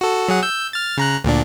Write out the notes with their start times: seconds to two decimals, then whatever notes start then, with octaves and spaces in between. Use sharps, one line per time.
0.01 F#4 A4
0.28 F#3 G#4 F#5
0.43 E6 G6
0.73 F6 A6
0.97 C#3 A#5 F#6
1.24 D2 A#2 D4